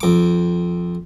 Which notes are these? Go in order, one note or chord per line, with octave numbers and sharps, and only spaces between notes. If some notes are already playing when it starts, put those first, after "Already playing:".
F2 D6